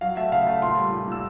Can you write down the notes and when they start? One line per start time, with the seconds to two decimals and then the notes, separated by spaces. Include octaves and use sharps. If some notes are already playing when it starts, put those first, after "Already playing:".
0.01 F#3 F5
0.17 A3 E5
0.32 C#3 F5
0.47 A3
0.62 A#2 C6
0.78 G3
0.92 A#2
1.08 A#2 E6